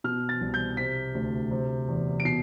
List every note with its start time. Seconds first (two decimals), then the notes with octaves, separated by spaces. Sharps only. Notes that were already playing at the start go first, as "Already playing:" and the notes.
0.04 B2 F6
0.29 A6
0.41 C2
0.54 G6
0.77 C3 B6
1.15 D2
1.51 C3
1.88 E2
2.20 D7
2.25 B2 C7